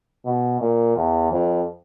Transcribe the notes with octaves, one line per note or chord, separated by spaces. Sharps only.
B2
A#2
E2
F2